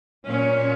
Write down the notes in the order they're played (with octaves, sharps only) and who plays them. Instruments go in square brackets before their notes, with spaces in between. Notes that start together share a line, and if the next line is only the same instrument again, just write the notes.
[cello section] A#2 F#3 C#4